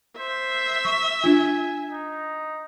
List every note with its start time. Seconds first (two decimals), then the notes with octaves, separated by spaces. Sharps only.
0.19 C5 E5
0.85 C#6
1.24 D4 F4 G#5
1.91 D#4